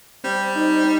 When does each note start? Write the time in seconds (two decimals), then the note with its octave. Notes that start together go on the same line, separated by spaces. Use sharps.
0.24 G3 C4
0.56 D#4